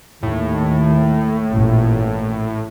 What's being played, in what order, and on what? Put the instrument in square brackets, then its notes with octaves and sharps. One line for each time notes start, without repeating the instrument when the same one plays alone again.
[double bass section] D#2 [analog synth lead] A2
[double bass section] A1 A#2